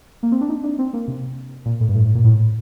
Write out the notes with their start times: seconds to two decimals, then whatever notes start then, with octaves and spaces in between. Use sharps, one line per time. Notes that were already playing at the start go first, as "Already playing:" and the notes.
0.23 A#3
0.32 C4
0.41 D4
0.49 D#4
0.64 D4
0.79 C4
0.93 A#3
1.08 C3
1.66 A#2
1.80 A2
1.88 G2
1.95 A2
2.05 A2
2.15 A#2
2.24 A2